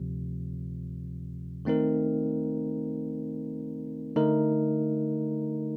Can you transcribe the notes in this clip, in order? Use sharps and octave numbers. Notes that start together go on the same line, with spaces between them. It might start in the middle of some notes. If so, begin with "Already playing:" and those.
Already playing: D2 C3 F3
D#3 A3 C4 D#4 A#4
D3 A3 D#4 A#4